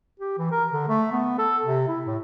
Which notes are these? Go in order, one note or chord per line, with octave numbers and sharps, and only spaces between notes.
G4
E3
A#4
D3
A3
B3
A4
C3
E4
A2